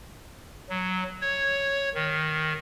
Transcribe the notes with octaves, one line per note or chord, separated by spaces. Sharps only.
F#3
C#5
D#3